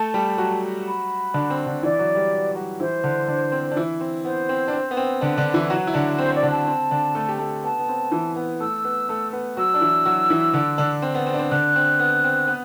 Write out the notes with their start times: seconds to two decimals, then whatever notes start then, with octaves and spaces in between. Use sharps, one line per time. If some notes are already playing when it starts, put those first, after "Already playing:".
Already playing: A3 A4 A5
0.14 G3 G4
0.38 F#3 F#4
0.87 B5
1.34 D3 D4
1.50 C4
1.67 D3 D4
1.83 E3 E4 D5
1.99 F#3 F#4
2.15 G3 G4
2.55 F#3 F#4
2.80 E3 E4 C5
3.04 D3 D4
3.28 D3 D4
3.52 C4
3.72 D4
3.76 E3 E4
4.01 C4
4.25 B3 C5
4.49 C4
4.68 D4
4.73 C4
4.91 B3
4.97 C4
5.21 D3 D4 B4
5.38 D3 D4
5.54 E3 E4
5.70 F#3 F#4
5.87 E4
5.94 D3 D4
6.19 C4 C5
6.35 D5
6.43 D3 D4
6.51 A5
6.67 C4
6.91 D3 D4
7.15 A3 A4
7.29 G4
7.39 A3 A4
7.64 B3 A5
7.79 B3
7.89 C4
8.12 E3 E4
8.36 B3 B4
8.60 A3 A4 E6
8.85 B3 B4
9.09 A3 A4
9.33 B3 B4
9.57 F#3 F#4 E6
9.74 D4
9.81 E3 E4
10.05 F#3 F#4
10.30 E3 E4
10.54 D3 D4
10.78 D3 D4
11.02 C4
11.15 B3
11.27 C4
11.34 D4
11.39 C4
11.51 D3 D4 F#6
11.76 C4
11.99 B3
12.24 C4
12.48 B3 B4